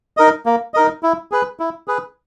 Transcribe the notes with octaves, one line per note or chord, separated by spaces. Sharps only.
D#4 A#4 D#5
A#3
D#4 A#4 D#5
E4
G#4 B4
E4
G#4 B4